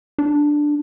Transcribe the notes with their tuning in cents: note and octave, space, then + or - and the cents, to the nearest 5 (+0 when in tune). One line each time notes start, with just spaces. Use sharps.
D4 +5